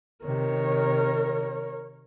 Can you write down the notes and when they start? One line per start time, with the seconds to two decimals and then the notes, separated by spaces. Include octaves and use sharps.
0.24 C3 D#3 A#4 C#5